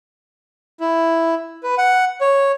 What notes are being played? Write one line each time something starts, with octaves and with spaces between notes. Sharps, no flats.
E4
B4
F#5
C#5